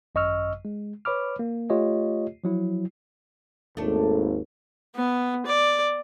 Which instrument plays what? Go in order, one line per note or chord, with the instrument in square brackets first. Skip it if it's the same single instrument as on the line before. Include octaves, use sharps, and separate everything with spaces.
[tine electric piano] G#1 F#2 D#5 C#6 E6 F6
G#3
B4 C#5 B5 D6 F6
A#3
A3 F4 G4 C#5 D#5
F3 F#3 E4
[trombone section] G#1 D#2 [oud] A3 D4
[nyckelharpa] B3
D5